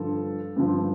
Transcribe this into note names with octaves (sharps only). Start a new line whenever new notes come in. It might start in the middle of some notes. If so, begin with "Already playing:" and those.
Already playing: G2 D3 F3 A4
G2 D3 F3